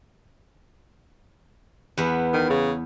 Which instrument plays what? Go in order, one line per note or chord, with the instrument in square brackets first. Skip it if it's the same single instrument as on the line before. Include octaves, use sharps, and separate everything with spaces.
[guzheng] E2 B3 E4
[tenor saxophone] D#3
C#3